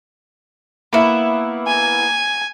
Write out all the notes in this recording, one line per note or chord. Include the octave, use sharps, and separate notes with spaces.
A#3 B3 E4
G#5